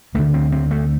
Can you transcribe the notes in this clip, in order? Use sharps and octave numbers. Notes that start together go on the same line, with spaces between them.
D2 D3 A3
C4
C4
A3